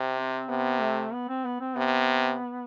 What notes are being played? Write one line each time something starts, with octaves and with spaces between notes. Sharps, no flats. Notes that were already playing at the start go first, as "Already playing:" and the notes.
Already playing: C3
C4
C3 B3
A3
B3
C4
B3
C4
C3 B3